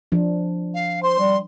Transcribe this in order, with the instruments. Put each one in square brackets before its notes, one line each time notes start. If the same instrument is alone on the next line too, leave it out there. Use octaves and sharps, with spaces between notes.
[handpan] F3 D4
[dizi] F5
[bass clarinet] C5 [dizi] C6
[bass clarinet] G3